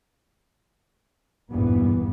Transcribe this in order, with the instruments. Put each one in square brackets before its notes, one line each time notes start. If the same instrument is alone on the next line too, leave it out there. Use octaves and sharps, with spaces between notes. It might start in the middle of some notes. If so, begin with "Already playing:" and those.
[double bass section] G#1 E2 G2 A#2 E3 B3